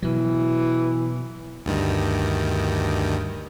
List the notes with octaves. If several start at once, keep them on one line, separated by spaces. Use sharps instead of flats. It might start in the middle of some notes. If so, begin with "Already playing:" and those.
B2 E3 F#3
D2 G2 D#3